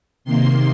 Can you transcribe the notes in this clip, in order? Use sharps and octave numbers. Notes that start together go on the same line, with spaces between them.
C3 D#3 A#3 C6